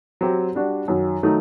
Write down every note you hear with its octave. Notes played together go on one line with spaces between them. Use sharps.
F#3 C4 G4
G3 D4 F#4
F#2 D#3 F#3
D#3 F#3 A3 D#4